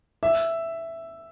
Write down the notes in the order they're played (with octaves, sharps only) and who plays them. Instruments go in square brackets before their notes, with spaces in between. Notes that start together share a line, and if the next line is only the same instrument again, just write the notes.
[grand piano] E5